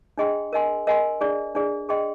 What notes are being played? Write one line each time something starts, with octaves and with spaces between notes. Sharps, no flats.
D4 G#4 D#5 G5 C6
A#4 D#5 G#5 C6
A#4 D#5 G#5 C6
D4 G#4 D5
D4 G#4 D5
G#4 D#5 G5 C6